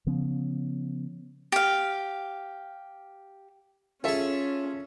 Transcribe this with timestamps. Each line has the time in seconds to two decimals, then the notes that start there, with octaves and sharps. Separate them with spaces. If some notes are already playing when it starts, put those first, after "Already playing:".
0.07 C#3 F3 B3 C#4
1.52 G4 F5
4.04 C#4 F4 G#4 A4 E5